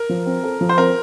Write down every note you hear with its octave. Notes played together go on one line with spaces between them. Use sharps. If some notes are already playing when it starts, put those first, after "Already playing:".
Already playing: A#4
F3
C4
A4
F3
C5
C4 A#4